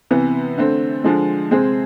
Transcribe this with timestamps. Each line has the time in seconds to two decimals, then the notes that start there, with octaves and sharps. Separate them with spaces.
0.11 C3 E3 B3
0.57 D3 A3 C4
1.04 D3 F3 G#3
1.51 C3 G#3 C4 G#4